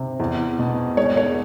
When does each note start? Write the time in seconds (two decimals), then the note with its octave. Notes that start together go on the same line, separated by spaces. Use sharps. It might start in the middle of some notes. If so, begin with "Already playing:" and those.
Already playing: C3
0.20 E2
0.59 B2
0.97 G#3 C#5
1.17 C#5